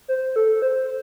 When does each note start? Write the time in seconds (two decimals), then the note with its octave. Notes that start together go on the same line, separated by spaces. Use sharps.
0.08 C5
0.36 A4
0.62 C5